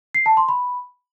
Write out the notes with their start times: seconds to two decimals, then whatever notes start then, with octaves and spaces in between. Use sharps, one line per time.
0.14 C7
0.26 A5
0.37 C6
0.49 B5